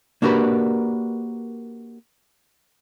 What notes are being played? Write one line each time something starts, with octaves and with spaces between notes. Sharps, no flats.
A#3 D4 F#4 G4 A#4 B4